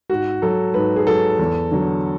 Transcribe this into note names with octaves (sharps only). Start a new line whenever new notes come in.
G#2 F#4
F#3 A4
G#2 B4
G#4
F#3 A4
E2
D3 F#3